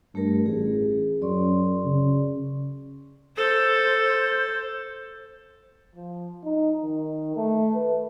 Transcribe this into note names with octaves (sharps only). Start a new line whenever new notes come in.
G2 A3 G4 A#4
A1 G#4
F#2 D5 C6 C#6
C#3
A4 C5
F3
D#4
D#3
A3
B4